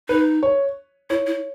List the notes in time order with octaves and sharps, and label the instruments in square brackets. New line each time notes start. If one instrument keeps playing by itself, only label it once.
[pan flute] D#4 [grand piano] B4
[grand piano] C#5
[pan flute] E4 [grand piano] C#5
[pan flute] E4